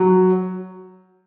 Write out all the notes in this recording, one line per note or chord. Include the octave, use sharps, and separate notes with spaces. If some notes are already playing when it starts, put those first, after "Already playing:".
Already playing: F#3